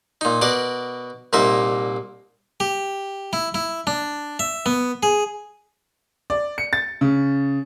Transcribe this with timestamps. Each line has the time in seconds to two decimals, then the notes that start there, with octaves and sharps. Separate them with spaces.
0.21 A#2 D#4
0.41 B2 A#4 D5 F#5
1.33 C2 A#2 A#3 D#4 E5
2.60 G4
3.33 E4
3.54 E4
3.87 D4
4.39 E5
4.66 B3
5.03 G#4
6.30 D5
6.58 C#7
6.73 A6
7.01 C#3